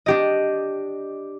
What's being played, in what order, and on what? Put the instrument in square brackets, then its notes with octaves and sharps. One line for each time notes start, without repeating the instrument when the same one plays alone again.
[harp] D4 G4 D#5